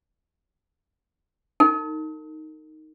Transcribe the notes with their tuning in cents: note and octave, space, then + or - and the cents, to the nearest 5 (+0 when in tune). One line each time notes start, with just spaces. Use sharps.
D#4 +0 A#4 -40